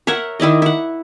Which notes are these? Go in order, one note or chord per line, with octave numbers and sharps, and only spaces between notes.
A#4 C#5 E5 F#5
D#3 E4 D5 D#5
E4 F#5